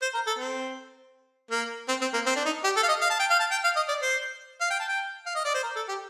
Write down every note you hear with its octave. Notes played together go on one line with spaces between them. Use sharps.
C5
A#4
A4
C4
A#3
C4
C4
A#3
C4
D4
D#4
G4
A4
F5
D#5
F5
A5
G5
F5
A5
G5
F5
D#5
D5
C5
F5
G5
A5
G5
F5
D#5
D5
C5
A#4
A4
G4